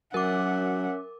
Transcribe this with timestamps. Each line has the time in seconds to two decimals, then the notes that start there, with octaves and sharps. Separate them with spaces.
0.14 F#3 C#4 A#4 E5 F#5 D6